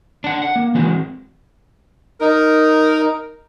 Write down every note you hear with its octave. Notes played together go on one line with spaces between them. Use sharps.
D4 F#5
F#5
A#3
E3 F#3 G#3 C4 F#4
D#4 A#4